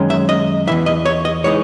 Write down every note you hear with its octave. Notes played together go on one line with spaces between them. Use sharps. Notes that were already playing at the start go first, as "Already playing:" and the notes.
Already playing: F#2 D#3 G#3 C#4
E5
D#5
E2 C#3 E3 E5
D#5
C#5
D#5
E3 G#3 D#4 C#5